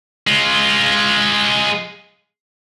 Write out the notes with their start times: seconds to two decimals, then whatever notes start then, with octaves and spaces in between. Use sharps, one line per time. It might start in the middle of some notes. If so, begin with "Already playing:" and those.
0.27 G#3 F4